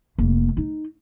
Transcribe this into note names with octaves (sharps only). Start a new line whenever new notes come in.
F1 A#3
D#4